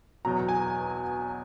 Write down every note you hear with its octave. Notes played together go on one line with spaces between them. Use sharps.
E2 B2 F#3 A#5
G#5